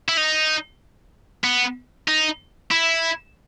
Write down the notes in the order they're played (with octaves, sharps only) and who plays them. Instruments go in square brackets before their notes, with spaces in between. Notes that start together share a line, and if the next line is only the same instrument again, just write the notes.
[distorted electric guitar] E4
D#4
B3
D#4
E4